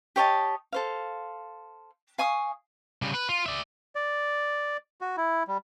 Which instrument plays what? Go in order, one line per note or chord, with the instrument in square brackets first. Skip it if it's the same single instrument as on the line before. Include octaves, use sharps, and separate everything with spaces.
[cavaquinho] G4 C#5 D#5 A5
A4 C5 F5
F5 G#5 C#6 D#6
[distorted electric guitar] C#3 G3
B4
F4
D5 E5
[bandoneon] D5
F#4
E4
G3